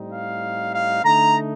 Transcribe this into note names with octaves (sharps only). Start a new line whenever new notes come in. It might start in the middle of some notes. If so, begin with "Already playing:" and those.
Already playing: A2 G3 C4 D#4
F5
F5
D3 A3 D#4 A#5